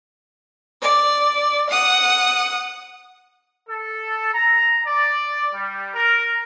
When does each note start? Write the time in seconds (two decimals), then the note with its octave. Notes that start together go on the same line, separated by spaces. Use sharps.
0.82 D5
1.69 F#5 D#6
3.68 A4
4.32 A#5
4.85 D5
5.53 G3
5.94 A#4